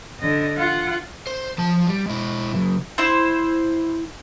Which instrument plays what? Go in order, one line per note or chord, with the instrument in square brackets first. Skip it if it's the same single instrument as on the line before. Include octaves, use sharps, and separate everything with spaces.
[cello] D3 D#5
F4 F#5
[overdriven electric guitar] C5
F3 A5
G3
G#3 E4
C#3 F#3
[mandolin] E4 C5